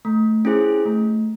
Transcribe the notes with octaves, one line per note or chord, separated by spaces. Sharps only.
A3
C#4 E4 G#4 C5
A3